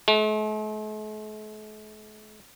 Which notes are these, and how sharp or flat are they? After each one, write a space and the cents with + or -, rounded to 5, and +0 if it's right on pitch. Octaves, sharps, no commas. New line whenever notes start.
A3 -45